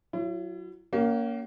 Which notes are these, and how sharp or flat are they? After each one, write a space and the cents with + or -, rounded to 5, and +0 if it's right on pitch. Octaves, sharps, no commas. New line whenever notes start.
F#3 +0 E4 +40
A#3 +0 C#4 +30 F#4 +45